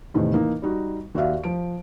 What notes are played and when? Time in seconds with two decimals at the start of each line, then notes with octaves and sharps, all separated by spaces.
0.14 E2 A2 C3 D#3
0.33 E3 A#3 D#4
0.62 G3 D#4 F#4
1.15 D#2 F#4 D5 E5 F5
1.44 F3 D7